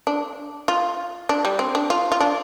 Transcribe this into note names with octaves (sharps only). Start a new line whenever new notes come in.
D4
F4
D4
G3
C4
D4
F4
F4
D4